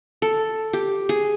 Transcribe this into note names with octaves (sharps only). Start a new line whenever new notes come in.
A4
G4
G#4